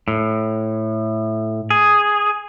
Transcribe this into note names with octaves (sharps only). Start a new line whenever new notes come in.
A2
G#4